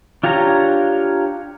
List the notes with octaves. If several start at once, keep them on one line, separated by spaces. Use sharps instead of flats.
D4 F4 G4 C#5 A#5